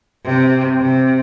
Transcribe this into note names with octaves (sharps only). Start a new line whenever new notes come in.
C3
C3